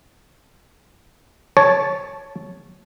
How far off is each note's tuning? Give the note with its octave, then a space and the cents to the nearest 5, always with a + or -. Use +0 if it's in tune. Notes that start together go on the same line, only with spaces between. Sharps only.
C#5 +0 A5 -10